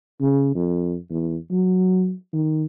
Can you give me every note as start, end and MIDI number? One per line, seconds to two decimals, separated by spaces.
0.21 0.51 49
0.55 0.97 41
1.10 1.37 40
1.51 2.13 54
2.33 2.66 51